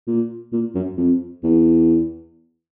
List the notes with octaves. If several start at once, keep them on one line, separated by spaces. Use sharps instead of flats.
A#2
A#2
F#2
F2
E2